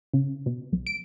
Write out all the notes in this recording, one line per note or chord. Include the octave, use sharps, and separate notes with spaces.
C#3
B2
B1
D7